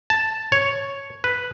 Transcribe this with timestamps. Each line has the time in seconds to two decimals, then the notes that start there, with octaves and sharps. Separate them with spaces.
0.10 A5
0.52 C#5
1.24 B4